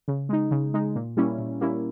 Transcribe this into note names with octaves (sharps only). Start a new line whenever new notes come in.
C#3
G#3 D#4
C#3
G#3 D#4
A#2
G3 A#3 C#4 E4
A#2
G3 A#3 C#4 E4